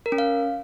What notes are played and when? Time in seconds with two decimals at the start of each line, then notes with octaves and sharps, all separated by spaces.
0.06 A#4
0.12 C#4
0.18 F5